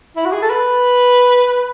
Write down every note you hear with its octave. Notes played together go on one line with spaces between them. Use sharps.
E4
F#4
G#4
A4
B4